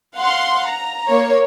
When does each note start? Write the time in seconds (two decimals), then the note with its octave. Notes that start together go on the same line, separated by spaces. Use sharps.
0.16 F5 F#5 C6
0.67 A#5
1.10 A#3 C#5